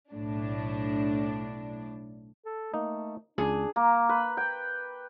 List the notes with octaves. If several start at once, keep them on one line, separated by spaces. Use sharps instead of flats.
B1 A2 D4
A4
A3 A#3 D#4
C#2 D4 G#4
A#3
B4
G5